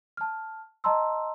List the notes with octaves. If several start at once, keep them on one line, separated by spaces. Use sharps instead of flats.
A5 F6
D#5 A5 A#5 C6 E6